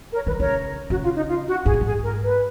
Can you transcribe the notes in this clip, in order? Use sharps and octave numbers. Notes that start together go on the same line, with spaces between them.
A#4 C#5
D#3 B4
C#3 A#4 C#5
C#3 F#4
F4
D#4
F4
F#4
G#2 G#4
A#2
G#2 G#4
A#4
B4